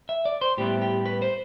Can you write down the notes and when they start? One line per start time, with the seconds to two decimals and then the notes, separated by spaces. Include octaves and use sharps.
0.09 E5
0.25 D5
0.41 C5
0.58 A2 G3 B3 E4 G4
0.82 G4
1.06 B4
1.22 C5